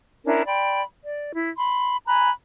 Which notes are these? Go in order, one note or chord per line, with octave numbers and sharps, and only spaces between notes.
C#4 D4 E4 A#4
D5 G5 B5 C6
D5
E4
B5 C6
G#5 A#5 B5 F#6